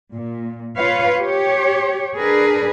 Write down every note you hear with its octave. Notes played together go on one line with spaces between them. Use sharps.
A#2
F4 B4 C#5 F5
G4 C#5
D4 G#4 A#4 B4